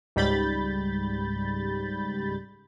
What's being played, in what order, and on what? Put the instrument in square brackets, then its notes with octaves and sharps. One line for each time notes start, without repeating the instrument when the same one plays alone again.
[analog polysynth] C#2 G#2 G3 B5 G6 A6